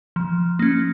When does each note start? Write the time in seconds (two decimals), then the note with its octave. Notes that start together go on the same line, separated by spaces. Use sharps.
0.16 F3
0.59 A#3 C#4